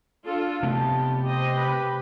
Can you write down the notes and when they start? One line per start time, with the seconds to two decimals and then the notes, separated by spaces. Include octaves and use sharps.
0.25 D4 F4 A4
0.63 C3 A3 B3 G4 A5
1.25 G4 C5 D#5
1.57 B4 B5